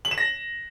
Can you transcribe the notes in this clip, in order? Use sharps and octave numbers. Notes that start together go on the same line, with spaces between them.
F#7
E7
A#6